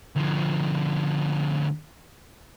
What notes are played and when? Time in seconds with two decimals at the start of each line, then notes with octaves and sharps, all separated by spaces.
0.16 D2 F3